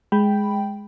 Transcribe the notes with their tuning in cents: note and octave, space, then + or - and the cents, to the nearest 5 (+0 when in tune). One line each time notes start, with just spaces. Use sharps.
G#3 +0 G5 +0 B5 +0